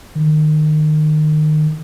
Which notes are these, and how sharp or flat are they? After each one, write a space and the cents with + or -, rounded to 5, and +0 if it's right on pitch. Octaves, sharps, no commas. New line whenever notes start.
D#3 -25